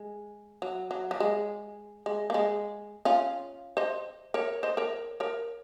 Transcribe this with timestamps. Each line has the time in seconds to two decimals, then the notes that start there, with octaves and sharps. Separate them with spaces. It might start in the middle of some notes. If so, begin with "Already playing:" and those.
Already playing: G#3
0.62 F#3
0.91 F#3
1.11 F#3
1.20 G#3
2.06 G#3
2.30 A#3
2.34 G#3
3.05 C#4 F4
3.77 C5 D#5
4.34 A#4 C#5
4.63 C5 D#5
4.77 A#4 C#5
5.20 A#4 C#5